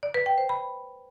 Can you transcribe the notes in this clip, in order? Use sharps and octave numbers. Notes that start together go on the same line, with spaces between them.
D5
B4
G5
C5
B5